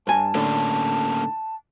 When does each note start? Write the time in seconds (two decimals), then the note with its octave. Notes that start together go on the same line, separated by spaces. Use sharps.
0.07 G2 G#5 A5
0.35 A2 D3 A#3 C#4 A4